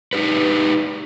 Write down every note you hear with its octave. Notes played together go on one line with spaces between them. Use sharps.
D#4 G4 B4